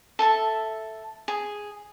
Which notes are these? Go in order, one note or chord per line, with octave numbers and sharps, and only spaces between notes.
A4 E5 A5
G#4